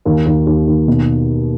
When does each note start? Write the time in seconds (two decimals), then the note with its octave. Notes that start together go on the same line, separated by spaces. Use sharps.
0.05 D#2
0.26 D#2
0.47 D#2
0.67 D#2
0.88 B2